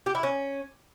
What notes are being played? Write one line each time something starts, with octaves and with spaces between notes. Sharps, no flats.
G4
E4
C#4